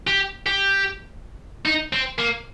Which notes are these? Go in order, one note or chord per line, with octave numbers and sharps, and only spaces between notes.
G4
G4
D#4
C4
A#3